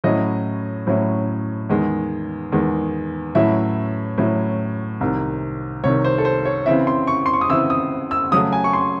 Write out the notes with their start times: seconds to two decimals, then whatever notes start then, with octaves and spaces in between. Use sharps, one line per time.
0.04 A2 F#3 C#4 E4 D#5
0.87 A2 F#3 C#4 E4
1.70 E2 D#3 G#3
2.52 E2 D#3 G#3
3.35 A2 F#3 C#4 E4 E5
4.18 A2 F#3 C#4 E4
5.01 C2 C3 D#3
5.83 C2 C3 D#3 C#5
6.04 C5
6.18 A4
6.25 C5
6.45 C#5
6.66 C#3 E3 C4 E4 E5
6.87 C6
7.07 C#6
7.26 C6
7.33 C#6
7.41 D#6
7.49 C#3 E3 C4 E4 E6
7.70 D#6
8.11 E6
8.32 C#3 F#3 A3 D#6
8.52 G#5
8.64 C#6
8.73 C6